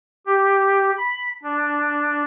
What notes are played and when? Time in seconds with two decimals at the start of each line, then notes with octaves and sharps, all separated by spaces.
0.26 G4
0.98 B5
1.43 D4